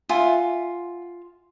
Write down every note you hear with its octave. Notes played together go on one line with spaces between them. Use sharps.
F4 E5 F#5 G#5